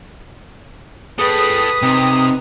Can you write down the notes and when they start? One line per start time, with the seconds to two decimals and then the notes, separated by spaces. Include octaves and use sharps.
1.19 G#4 A4 B4 G5 D#6
1.82 C3 C4 D#4 G5